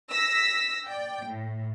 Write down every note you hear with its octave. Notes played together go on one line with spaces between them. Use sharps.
E6 A#6 B6
D5 G5
A2